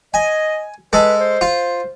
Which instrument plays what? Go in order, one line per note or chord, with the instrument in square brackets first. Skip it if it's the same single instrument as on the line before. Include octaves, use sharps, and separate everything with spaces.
[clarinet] D#5 [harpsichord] G#5
[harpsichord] G#3 A4 [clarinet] B4
[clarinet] C5
[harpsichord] F4